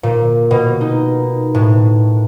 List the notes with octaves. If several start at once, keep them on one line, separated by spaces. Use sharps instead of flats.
A#2
B2
D#4
A2